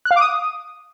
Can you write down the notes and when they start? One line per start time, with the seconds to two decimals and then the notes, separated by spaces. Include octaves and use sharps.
0.05 F#6
0.11 F5
0.16 D6
0.21 D#6